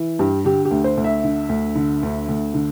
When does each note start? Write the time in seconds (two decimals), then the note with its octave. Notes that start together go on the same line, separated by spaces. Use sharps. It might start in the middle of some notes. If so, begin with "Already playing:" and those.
Already playing: E3
0.19 G2 G4
0.45 D3 G4
0.65 G4
0.71 D2
0.84 C5
0.97 D2
1.04 E5
1.24 D3
1.49 D2
1.75 D3
2.03 D2
2.28 D2
2.54 D3